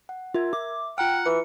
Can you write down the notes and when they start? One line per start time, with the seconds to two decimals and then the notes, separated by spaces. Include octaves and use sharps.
0.09 F#5
0.34 F4 A#4 E5 G#6
0.53 E5 D6
0.98 F4 F#5 G5 A#5 F6
1.25 E3 C#7